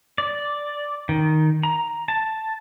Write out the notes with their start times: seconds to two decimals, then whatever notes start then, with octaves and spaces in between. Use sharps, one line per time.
0.18 D5
1.09 D#3
1.63 A#5
2.08 A5